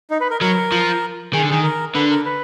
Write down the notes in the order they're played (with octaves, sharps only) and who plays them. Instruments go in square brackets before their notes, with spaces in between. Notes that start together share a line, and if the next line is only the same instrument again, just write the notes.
[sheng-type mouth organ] D#4
B4
A#4
[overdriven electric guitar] F#3 [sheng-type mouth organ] A#4
[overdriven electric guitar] F3
[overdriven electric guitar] D#3 [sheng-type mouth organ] G#4
[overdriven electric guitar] D3
[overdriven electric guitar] D#3 [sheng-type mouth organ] G#4
[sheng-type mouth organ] A#4
[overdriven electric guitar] D3 [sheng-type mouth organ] B4
[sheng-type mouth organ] A#4
B4